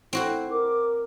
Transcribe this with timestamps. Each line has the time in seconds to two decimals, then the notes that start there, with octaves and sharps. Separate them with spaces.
0.13 C4 E4 F#4 C5
0.51 A#4 D6